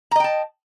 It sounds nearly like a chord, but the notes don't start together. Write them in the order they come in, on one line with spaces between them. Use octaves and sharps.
A#5 D#5 G5 A5